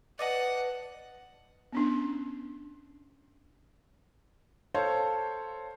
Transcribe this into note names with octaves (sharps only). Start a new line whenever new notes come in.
B4 D5 D#5 F#5 A5
B3 C#4 D4
A4 C5 C#5 F5